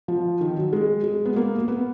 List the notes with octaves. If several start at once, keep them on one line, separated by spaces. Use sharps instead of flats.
F3
D#3
F#3
G#3
G#3
B3
A#3
A#3
B3